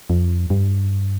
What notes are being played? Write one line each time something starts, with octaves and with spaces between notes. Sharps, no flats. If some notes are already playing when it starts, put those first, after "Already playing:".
F2
G2